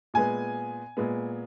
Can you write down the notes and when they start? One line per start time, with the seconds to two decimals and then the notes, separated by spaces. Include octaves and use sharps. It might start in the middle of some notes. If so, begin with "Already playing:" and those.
0.14 A#2 G#3 B3 G#5
0.97 A#2 G#3 B3